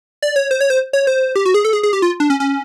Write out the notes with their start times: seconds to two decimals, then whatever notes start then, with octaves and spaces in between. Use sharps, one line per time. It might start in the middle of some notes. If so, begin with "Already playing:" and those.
0.22 D5
0.36 C#5
0.51 C5
0.61 C#5
0.70 C5
0.93 C#5
1.07 C5
1.36 G4
1.45 F#4
1.54 G#4
1.65 A4
1.73 G#4
1.83 G#4
1.93 G4
2.02 F4
2.20 D4
2.30 C#4
2.40 C#4